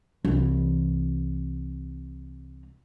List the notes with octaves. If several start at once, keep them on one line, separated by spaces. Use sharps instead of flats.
C2 E3